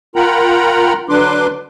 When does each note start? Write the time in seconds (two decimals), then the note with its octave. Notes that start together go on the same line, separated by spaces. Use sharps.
0.16 F4 A#4 F#5 G5 A#5 B5
1.09 D3 F#3 D4 B4 C6 D6